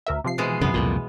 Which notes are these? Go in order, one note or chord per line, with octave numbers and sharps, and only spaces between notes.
D2 A#4 E5
C3 F3 C7
B2 E3 G#3
F#2 C#3 B3
C2 F2 A#2